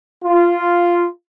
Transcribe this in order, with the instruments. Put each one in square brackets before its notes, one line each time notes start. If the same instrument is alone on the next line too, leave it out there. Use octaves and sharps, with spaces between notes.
[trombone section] F4